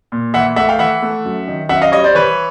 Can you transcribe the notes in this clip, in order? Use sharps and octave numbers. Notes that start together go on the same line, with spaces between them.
A#2
E3 E5 F#5
A3 E5 F#5
F5 G5
E3 E5 F#5
A3
F#2
D#3
F#2 E5 F#5
D#5 F5
G3 C#5 D#5
C5 D5
E3 B4 C#5